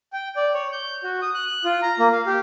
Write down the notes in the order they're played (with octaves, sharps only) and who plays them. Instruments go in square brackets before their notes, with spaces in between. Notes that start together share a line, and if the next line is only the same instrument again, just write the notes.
[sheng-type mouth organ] G5
D5
C#5
G6
F#4
D#6
F#6
F4
A#5
A#3
F5
G4